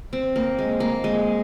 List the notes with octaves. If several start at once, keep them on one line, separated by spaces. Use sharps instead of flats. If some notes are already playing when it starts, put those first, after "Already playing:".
C4
A#3
G#3
A#3
G#3